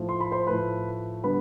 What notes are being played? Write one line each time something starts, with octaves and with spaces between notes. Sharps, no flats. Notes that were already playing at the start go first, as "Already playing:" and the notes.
Already playing: A2 F3 A3
C6
B5
C5 C6
A2 F3 A3 B4 B5
D3 G3 B3 B4 B5